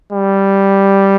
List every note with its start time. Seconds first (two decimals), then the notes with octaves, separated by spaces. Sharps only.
0.13 G3